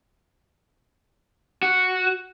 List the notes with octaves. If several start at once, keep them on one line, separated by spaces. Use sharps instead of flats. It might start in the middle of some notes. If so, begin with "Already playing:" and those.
F#4